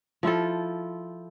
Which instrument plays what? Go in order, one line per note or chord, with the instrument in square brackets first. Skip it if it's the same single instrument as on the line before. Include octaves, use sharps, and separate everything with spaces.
[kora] F3 E4 F4 A4